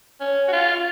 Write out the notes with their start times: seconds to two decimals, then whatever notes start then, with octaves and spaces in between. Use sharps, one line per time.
0.21 C#4
0.48 F#4
0.53 F4